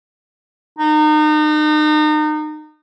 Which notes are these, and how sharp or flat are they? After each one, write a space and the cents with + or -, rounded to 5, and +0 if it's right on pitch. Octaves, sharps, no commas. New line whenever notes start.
D#4 -35